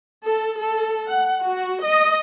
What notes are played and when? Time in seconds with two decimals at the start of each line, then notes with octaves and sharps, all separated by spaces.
0.24 A4
0.59 A4
1.08 F#5
1.44 F#4
1.85 D#5